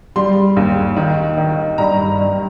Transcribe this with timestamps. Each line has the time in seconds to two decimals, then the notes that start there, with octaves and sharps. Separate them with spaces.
0.16 G3 C6
0.56 D#2
0.97 D#3
1.38 D#3
1.78 G2 A#5
2.19 G2